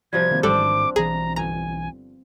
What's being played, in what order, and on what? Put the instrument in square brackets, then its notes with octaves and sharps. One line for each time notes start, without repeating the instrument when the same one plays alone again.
[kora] C3 F3 G3 [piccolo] G#6
[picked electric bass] D#3 A#3 C4
[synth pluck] A1 G3 A4 [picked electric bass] G#2 D#3 [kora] C4 D4 [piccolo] D6
[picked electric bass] B1 E3 [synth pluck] G#4 [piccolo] A#5
[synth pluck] G1 A#5 [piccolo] G#5